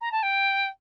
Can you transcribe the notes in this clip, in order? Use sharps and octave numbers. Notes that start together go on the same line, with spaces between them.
A#5
A5
G5